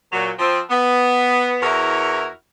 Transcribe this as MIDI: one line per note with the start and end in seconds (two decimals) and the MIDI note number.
0.13 0.31 46
0.13 0.31 54
0.39 0.60 53
0.39 0.60 60
0.70 1.58 59
1.63 2.28 40
1.63 2.28 64
1.63 2.28 66
1.63 2.28 70
1.63 2.28 73